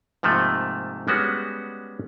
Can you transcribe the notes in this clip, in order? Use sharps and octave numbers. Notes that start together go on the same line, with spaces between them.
G#2 C3 F3 A3 A#3
G3 G#3 B3 C#4 F#4